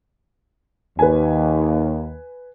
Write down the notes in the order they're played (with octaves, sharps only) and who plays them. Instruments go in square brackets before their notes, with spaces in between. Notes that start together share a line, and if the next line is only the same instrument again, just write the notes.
[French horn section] D#2 [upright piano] B4 G#5